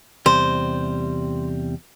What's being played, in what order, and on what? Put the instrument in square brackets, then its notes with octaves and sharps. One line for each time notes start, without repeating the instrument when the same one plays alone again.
[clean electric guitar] E2 C3 G3 [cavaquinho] C5